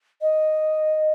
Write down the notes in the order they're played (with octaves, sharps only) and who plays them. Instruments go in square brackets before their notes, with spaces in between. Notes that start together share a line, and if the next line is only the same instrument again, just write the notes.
[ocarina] D#5